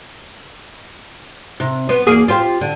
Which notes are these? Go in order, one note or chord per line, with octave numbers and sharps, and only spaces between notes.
C3
B3 C5
E2 A#3 G#4
F4 G4 C5
D3